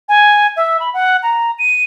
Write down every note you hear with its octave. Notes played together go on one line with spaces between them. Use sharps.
G#5
E5
B5
F#5
A#5
D#7